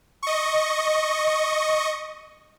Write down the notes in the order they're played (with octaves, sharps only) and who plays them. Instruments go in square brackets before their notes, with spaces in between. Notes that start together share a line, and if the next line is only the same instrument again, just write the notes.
[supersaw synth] D#5 C#6